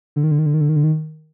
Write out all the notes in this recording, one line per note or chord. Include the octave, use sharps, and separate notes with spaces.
D3
D#3
D3
D#3
D3
D#3
D3
D#3
D3
D#3